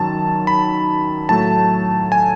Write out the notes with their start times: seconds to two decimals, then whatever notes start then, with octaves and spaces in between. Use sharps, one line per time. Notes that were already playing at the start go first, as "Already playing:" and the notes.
Already playing: F#2 D#3 F#3 A5
0.47 B5
1.29 A2 F#3 A3 A5
2.12 G#5